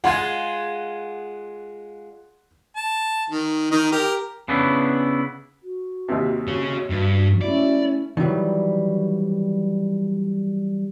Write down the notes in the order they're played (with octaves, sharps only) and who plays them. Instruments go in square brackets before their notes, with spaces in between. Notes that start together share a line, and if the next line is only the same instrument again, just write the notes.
[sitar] G#3 F4 [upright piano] F#5 C6 G#6
[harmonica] A5
D#3
D#3 D#4
G4 A#4
[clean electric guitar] C#3 B3 D4 E4
[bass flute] F#4
[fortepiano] D#2 C3
[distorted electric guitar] G#4 C#5
G2
[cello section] A3 C#4 E4 [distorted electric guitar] D5
[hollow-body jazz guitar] D#3 E3 F#3 G3